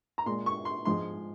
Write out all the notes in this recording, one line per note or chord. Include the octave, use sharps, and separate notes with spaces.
A#5
A#2 G#3 C6
C#6
C6
G#2 F3 G#3 C6